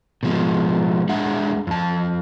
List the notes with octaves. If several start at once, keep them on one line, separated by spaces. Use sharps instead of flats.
B2 F3 G#3
G#3 D4 G#4 E5 F#5
F2 A5